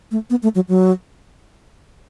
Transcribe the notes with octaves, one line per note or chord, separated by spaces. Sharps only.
A3
B3
A3
F#3
F#3